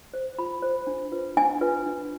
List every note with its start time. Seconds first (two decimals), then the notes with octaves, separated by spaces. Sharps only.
0.14 C5
0.38 F4 B5
0.62 C5
0.87 D4
1.12 F4 B4
1.37 D4 G#5
1.61 F4 B4
1.86 D4